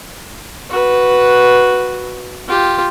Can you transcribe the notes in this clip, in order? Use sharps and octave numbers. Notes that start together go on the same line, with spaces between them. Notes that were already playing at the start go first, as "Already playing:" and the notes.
F#4 B4
F4 G4